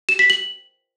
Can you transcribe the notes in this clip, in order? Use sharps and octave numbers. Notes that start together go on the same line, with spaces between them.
E7
B6
F#7